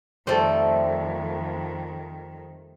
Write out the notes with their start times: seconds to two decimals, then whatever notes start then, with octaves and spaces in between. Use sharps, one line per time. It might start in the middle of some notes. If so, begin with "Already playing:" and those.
0.27 F2 D#3 G3 A3 A4 C5